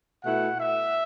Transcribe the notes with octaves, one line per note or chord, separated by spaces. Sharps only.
B2 A3 E4 F#5
E5